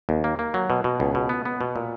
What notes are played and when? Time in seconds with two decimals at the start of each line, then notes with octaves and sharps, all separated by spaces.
0.09 D#2
0.24 A#3
0.39 A#3
0.54 F#3
0.70 B2
0.84 B2
1.00 C#2
1.15 B2
1.29 B3
1.45 B3
1.61 B2
1.76 A#2